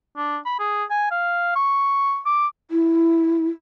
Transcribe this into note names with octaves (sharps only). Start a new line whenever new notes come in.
D4
B5
G#4
G#5
F5
C#6
D6
E4